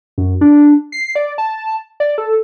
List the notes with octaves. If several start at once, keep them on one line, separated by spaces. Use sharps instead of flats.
F#2
D4
C7
D5
A5
D5
A4